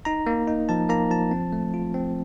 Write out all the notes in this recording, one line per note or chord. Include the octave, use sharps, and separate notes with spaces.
D#4 A#5
A#3
D#4
F3 A5
A#3 A#5
F3 A5
C4
A3
F4
C4